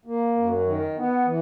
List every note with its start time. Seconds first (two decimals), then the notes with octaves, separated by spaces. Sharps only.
0.05 A#3
0.35 F#2
0.66 D#3
0.96 B3
1.25 E3